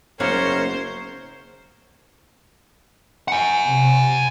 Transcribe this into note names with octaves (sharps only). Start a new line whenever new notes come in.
F#1 A#3 B3 C#4 A#4 C5 C#5
F#5 G#5
C3